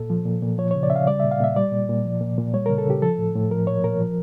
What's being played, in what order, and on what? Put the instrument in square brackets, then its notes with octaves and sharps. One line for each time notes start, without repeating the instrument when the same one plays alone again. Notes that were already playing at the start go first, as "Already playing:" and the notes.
Already playing: [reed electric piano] A#2 A4
F3
A#2
A#2
F3 C#5
C#3 C#5
D5
C#3 E5
F5
G3 D5
A#2 E5
F5
A#2 E5
G3 D5
A#2
A#2
F3
A#2
A#2
G3 C#5
C#3 A#4
A4
C#3 G4
F3 A4
A2
A2
F3 A#4
A#2 C#5
A#2 A#4
F3